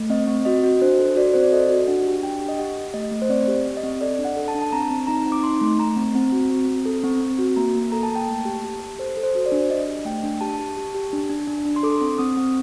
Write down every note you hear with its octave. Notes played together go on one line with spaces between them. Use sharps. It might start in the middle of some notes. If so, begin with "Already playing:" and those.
Already playing: A3
C4 D#5
C4
F#4 D#5
F#4
D4 C5
A4
F#4 D5
C4 C5
D5
A4 D#5
F#4
D4 F#5
G4
D4 G5
G4
D#5
G4 F#5
G4
A3 D#5
A3
C5
C4 D5
G4
G4
D#5
C4
A4 D5
D4
F#5
A4
A5
D4
A5
C4 A#5
C4
D#4 A#5
C4
D6
D#4 C6
A3
A3 A#5
C4
C4
F#4
C4
C4
A4
C4
C4
F#4
A#3 A#5
A#3
A4 A#5
A5
A#3
G5
A3 A5
G4
G4
G4
A4 C5
A4
C5
F#4
C5
D5
D4
D4 D#5
G4
A3 G5
D4
G4 A5
G4
G4
G4
D4
D4
D4
D4
C6
A4 D6
C4
C4 D#6
C4